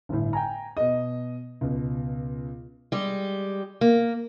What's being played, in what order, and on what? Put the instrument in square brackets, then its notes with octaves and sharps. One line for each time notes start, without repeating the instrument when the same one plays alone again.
[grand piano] G1 A2
G5 G#5 A#5
B2 D#5
C#2 B2
[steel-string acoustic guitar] G3 G#3 G4
A#3